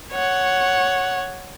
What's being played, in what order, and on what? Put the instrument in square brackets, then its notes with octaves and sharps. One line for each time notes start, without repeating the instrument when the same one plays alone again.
[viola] C#5 F#5